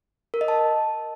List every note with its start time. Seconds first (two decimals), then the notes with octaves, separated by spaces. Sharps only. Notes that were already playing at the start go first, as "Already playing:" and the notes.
0.34 A#4
0.41 D#5
0.48 A5